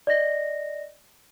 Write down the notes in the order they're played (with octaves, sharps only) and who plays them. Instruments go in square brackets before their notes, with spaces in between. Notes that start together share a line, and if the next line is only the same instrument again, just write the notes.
[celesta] D5 D#5 A#6